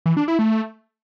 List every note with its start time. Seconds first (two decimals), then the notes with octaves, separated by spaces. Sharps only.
0.06 E3
0.17 D4
0.28 E4
0.39 A3